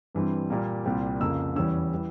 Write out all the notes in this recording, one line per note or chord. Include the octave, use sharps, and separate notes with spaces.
G2 E3 G3 C4
A#2 G3 A#3
C2 A#2 G3 C4
F2 C#3 F3 A#3 E6
E2 E3 G3 C#4 E6
E3 G3